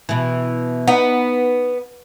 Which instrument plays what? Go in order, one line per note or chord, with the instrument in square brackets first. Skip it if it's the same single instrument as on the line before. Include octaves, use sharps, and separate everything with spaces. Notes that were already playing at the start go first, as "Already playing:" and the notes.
[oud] B2 E3
[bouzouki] B3 [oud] D#4